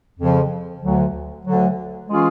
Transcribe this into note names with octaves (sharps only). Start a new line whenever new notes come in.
F2 C#3 F3
D2 D3 F#3
D2 D3 F#3
E3 G#3 C#4 F4 G#4